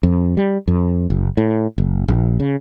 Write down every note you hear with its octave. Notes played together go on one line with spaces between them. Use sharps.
F2
G3
F2
F#1
A2
F#1
A#1
C#3